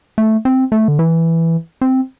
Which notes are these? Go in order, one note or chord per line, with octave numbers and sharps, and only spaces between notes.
A3
C4
A3
D3
E3
C4